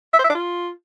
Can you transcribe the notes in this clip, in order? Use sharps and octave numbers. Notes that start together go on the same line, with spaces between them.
E5
C5
E5
D4
F4